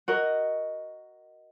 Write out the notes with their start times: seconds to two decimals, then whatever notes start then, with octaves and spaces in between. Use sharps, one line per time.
0.08 F#4 A#4 D#5